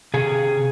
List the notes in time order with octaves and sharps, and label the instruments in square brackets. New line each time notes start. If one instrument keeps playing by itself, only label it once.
[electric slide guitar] C3 G#4